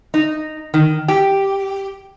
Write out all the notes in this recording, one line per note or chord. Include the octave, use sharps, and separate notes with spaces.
D#4
D#3
G4